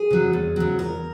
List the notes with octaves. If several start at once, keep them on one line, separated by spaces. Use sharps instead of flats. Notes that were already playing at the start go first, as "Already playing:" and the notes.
Already playing: G#4
C#3 F#3
E2
C#3 F#3
E2 A#4